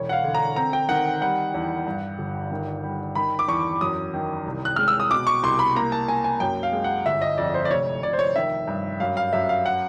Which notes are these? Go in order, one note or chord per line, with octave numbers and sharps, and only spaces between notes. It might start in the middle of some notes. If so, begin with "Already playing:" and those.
Already playing: E1 C#5
F#5
F5
D3
A#5
C4 A#5
G5
D#3 F#5
G3 F#5
E2
G2
G1
D#3
G3
D#3 B5
D6
E2 C#6
F#2 D#6
D#3
C2
F#6
G#3 F6
E6
D#6
B2 D6
C#6
C2 C6
B5
A#3 A#5
A5
A#3 G#5
G#5
F#2 G5
F5
G#3
F#5
G1 E5
D#5
F2 D5
C5
D5
F1 C#5
F1 D5
C5
C#5
D#3 E5
G2
F#2 F5
F5
F#2 E5
F5
F#5